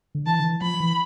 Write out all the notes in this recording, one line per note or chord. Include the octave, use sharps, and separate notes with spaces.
D3
E3 A5
D3
E3
F3 B5
E3